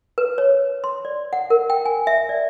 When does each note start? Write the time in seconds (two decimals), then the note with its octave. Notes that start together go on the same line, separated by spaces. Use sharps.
0.18 B4
0.38 C#5
0.84 C6
1.05 D5
1.33 F#5
1.50 A#4
1.70 G5
1.85 G#5
2.07 E5
2.29 D5